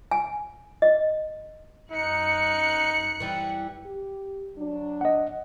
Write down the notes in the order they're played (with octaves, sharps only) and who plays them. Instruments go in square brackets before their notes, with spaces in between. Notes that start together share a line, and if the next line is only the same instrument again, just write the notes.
[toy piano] G#5
D#5
[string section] F#2 F#6 C#7 [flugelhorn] D#4
[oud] E3 G3
[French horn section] G4
F#3 D4
[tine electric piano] D#5 F#5